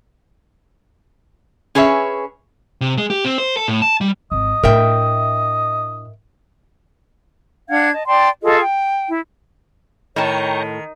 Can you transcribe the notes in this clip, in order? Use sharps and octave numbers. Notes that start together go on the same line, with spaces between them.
C#4 G#4 B4 C#5 E5
C3
G#3
G4
C4
C5
A4
A2
A5
G3
G#1 D#5
A2 D4 A#4 E5 G5
D4 F5 F#5 G#6
D#5 A5
D5 G5 A5 C6
F4 G#4 A4 D#5
G5
E4
A2 D#3 C#5 G5 A5 A#5 C#6